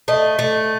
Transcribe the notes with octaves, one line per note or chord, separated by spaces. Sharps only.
A3 D#5
A3